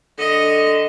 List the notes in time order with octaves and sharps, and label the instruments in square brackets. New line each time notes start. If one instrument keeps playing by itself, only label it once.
[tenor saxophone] D3 [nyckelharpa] D#5